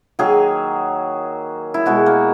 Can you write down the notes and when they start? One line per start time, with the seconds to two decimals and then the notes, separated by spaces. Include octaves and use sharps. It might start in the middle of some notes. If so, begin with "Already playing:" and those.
0.19 D#3 F#3 A#3 G#4
1.74 E4
1.86 B2 G#3 F#4
2.06 A#3